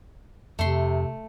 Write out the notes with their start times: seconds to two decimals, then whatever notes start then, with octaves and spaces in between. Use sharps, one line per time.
0.59 F2 C3 A3 C6